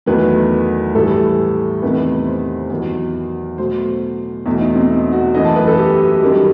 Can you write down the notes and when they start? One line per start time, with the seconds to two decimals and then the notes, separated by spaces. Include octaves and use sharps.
0.06 E2 D#3 F#3 A3 B4
0.94 A2 E3 G3 A4
1.82 E2 C3 D#3 A3 B4
2.27 C5
2.70 E2 D#3 F#3
3.58 B2 F#3 A3 C5
4.46 E2 B2 A3 D#4
4.61 D#4
4.76 C4
4.90 D#4
5.12 F#4
5.34 F#2 E3 A3 D#5
5.44 A5
5.56 B4
5.67 A4
5.78 G4
6.22 F#2 D#3 G3